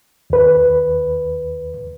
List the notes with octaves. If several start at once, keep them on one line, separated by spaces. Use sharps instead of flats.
D#2 B4